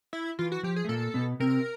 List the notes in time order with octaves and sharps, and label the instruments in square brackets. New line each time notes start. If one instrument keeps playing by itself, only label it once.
[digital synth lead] E4
[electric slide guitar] E3 [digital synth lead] F4
[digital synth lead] F#4
[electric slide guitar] F3 [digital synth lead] G4
[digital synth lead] G#4
[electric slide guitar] A3
[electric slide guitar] A#2 A#3 [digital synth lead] A4
[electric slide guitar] B2 B3
[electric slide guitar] C3 C4 [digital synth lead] A#4